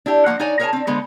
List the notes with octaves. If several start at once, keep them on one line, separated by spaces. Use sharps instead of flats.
D4 E4 G4
F3 F#3 A#3 F#5
D#4 C#5 D5 G#5
G#4 A#4 C#5 F#5 G#5 A5
C4 D4
D3 G#3 B3 C5